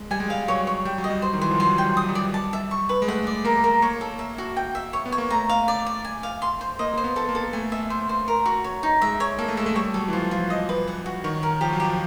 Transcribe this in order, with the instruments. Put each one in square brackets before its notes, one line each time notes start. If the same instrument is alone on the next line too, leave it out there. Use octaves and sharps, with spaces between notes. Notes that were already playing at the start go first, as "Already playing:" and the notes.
Already playing: [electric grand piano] G#3
[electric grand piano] G3 [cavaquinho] G#5
[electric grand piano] G#3
[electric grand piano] G3 [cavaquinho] F5
[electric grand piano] F#3 [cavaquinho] C#5
[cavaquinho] C#5
[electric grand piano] G3 [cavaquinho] G5
[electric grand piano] F#3
[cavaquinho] D#5
[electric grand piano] G3
[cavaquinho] C5
[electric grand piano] D#3
[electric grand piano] E3 [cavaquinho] C5
[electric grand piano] F3
[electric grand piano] F#3 [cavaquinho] C6
[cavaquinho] G5
[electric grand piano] G3
[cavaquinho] D#6
[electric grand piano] G3
[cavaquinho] D5
A5
E5
C#6
B4
[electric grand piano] G#3
[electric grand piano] A3 [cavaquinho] F#5
[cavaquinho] D5
[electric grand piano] A#3 [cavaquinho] A#4
[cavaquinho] A#4
[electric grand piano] A#3 [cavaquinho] C#5
[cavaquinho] A4
E5
F#4
G5
E5
C#5
[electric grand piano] B3
[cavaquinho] C#5
[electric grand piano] A#3
[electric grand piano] A3 [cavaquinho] A#5
[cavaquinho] F5
D5
D5
G#5
F5
C6
C5
[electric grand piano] A#3 [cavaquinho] D#5
[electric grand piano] A#3 [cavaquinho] C5
[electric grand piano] B3
[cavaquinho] A4
[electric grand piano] A#3
[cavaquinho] A4
[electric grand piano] A3 [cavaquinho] G#5
[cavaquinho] E5
C5
C5
A#4
F#4
C#5
D#4
[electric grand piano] G#3 [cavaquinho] E5
[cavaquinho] C#5
[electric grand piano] A#3 [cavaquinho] A4
[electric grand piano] A3
[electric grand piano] G#3 [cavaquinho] A4
[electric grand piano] A3
[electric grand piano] G3 [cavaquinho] C#5
[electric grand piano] F#3 [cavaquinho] A4
[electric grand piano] E3
[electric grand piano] F3 [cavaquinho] F4
[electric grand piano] F3 [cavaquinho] F4
[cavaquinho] D#5
B4
F#5
F#4
[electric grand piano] D#3 [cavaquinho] C#5
[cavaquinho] A#4
[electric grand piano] F3 [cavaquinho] G4
[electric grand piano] F#3
[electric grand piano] F3 [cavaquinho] G4